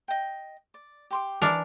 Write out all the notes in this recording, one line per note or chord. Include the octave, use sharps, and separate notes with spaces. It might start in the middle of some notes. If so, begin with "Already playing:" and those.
D#5 G5
D5
G4 C6 D6
E3 D4 A#4 D5 A5